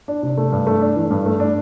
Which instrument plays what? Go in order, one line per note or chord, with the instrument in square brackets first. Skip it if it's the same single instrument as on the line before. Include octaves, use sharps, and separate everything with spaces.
[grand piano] D4
C3
A3
G2
A3
D4
E3
G2
A3
D4